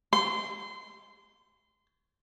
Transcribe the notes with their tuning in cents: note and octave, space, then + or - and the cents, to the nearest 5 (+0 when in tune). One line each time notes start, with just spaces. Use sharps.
C6 -25